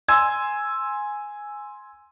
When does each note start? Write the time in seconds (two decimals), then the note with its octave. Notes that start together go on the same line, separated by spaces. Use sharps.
0.09 G#5 C6 E6 G#6